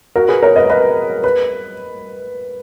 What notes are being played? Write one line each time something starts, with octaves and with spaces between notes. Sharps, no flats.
F#4 A#4
G#4 B4
A#4 C#5
B4 D#5
B4 D#5
B4